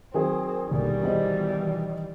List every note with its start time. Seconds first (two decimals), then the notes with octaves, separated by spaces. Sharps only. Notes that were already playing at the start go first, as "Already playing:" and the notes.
0.14 D#3 F#3 C4 G#4
0.71 A#1 D#2 B2 D3 G3
1.03 B2 D#3 E3 G#4 C5 D#5